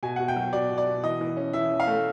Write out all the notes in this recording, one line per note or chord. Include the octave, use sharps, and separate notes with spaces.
B2 G#5
B2 F#5
G5
F#3
B2 D5
B2
D5
B2
E3 D#5
E3
C#4
E3 E5
C#4
F5
A3